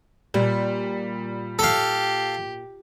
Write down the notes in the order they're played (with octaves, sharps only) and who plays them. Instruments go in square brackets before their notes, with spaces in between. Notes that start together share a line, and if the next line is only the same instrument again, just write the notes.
[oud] A#2 [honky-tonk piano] G3
[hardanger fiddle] G4 [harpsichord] A4 F5